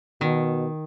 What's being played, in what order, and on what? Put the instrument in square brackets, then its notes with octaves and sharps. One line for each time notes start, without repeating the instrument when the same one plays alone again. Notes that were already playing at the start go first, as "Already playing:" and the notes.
[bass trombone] B2 [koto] D#3